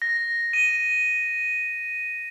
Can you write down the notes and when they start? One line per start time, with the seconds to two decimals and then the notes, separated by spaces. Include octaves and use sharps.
0.02 A#6
0.53 D#7